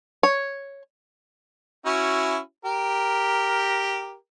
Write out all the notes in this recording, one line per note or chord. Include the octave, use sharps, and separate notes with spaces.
C#5
C#4 E4 F#4
G4 A#4